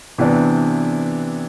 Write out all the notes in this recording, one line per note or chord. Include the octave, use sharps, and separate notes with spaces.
C3 E3 B3 D4